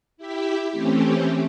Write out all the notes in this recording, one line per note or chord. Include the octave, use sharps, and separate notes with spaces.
E4 G4 E5
E3 A3 C4 C#4 G4